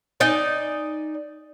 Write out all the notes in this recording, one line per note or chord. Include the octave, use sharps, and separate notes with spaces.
D#4 D5 G#5